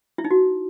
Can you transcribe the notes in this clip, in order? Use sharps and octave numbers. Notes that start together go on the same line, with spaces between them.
E4
D#4
F#4